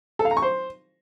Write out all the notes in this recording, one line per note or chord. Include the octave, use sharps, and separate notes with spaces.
A4
F5
A#5
C#6
C5